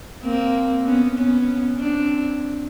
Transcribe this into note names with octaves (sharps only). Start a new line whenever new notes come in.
A#3 C4
B3 C#4
B3 C#4
C4 D4